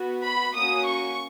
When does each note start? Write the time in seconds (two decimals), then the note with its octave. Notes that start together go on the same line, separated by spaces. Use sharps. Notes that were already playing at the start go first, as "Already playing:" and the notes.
Already playing: B3 F#4
0.23 B5
0.54 A#3 C#4 F#4 D#6
0.86 C#6